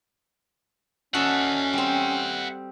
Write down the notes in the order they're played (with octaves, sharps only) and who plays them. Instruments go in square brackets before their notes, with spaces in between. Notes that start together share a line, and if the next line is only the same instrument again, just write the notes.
[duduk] C#4 [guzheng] F#4 A4 D#5 [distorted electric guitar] E5 F#5
[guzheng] G3 C4